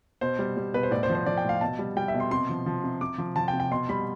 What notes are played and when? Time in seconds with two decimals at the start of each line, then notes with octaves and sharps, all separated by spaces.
0.21 B2 C5
0.39 G3
0.57 G3
0.74 B2 B4
0.83 C5
0.91 A2 D5
1.03 C5
1.10 F3
1.15 C5
1.26 F3 D5
1.37 G5
1.44 A2 F5
1.61 B2 A5
1.79 G3
1.96 G3 G5
2.08 E5
2.14 B2
2.20 C6
2.31 C3 C6
2.49 F3
2.66 F3
2.84 C3
3.01 C3 D6
3.18 F3
3.36 F3 A5
3.48 G5
3.53 C3
3.60 G5
3.71 B2 C6
3.89 G3 B5